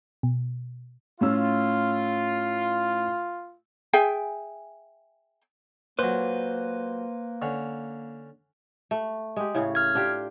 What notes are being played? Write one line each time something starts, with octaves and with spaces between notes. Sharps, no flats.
B2
A2 C#4 F4 E6
G#4 E5 G5 G#5
A#2 F#3 A#3 B4 C5
D3 C#4
A3
G#3 G4
A2 C#3 C#4
F6 G#6
D4 F4 G4